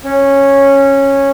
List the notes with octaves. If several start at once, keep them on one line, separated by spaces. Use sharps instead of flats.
C#4